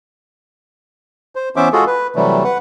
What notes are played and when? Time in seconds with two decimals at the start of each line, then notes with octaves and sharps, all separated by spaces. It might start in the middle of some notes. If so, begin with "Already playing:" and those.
1.35 C5
1.56 E3 B3 C#4 C5 E5 D6
1.73 G#3 F4 F#4 G#4 A4
1.87 B4
2.16 C3 E3 F#3 G3 A3
2.44 B4 F#5